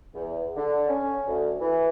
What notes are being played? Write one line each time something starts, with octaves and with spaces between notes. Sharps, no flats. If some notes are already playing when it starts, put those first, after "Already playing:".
E2
D3
C#4
D2
E3